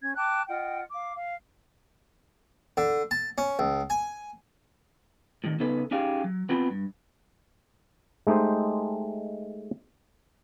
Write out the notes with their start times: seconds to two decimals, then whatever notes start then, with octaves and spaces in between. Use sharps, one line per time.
0.01 C#4 G#6
0.15 G5 A5 D6 F#6
0.48 F4 D#5 F#5 G5
0.91 F5 D6
1.14 F5
2.77 D3
3.11 A5
3.38 C#4
3.59 C#2
3.90 G#5
5.44 A2 D#3
5.60 C#3 B3 D#4 A4 B4
5.91 C#4 D#4 G4 G#4 F5
6.24 F#3
6.49 B3 C4 F4 B5
6.70 G2
8.27 G#3 A3 D#4 G4 C5